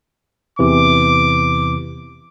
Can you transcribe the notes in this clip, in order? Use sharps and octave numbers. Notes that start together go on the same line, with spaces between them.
E2 C3 E3 D6